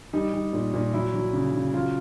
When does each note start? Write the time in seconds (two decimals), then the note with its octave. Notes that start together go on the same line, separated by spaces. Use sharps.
0.13 G3 D#4
0.33 G3
0.53 A#2
0.74 A#2
0.93 F#3 E4
1.14 F#3
1.33 C#3
1.53 C#3
1.73 F#3 F4